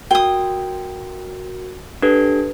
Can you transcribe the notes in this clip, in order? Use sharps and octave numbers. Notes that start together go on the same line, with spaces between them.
F#4 A#4 G5 D#6
D4 G4 A4 B4